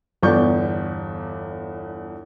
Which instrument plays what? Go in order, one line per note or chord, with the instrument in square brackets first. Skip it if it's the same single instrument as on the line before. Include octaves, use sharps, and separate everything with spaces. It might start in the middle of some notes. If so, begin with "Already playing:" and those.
[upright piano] G1 E2 D5 C#6 G6